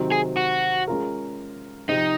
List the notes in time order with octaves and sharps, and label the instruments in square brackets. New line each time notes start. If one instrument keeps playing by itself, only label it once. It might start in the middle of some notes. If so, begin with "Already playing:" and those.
Already playing: [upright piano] C3 D#3 F#3 C4 D#4
[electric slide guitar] G#4
F#4
[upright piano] G#3 C#4 F4 A#4
[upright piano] C3 F3 C4 [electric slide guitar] D#4